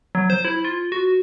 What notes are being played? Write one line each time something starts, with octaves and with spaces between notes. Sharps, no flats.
F#3
C5
E4
F4
F#4